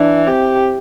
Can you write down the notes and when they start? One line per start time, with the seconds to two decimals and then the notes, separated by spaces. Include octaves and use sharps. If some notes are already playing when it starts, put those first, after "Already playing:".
Already playing: E3 D4
0.27 C4 G4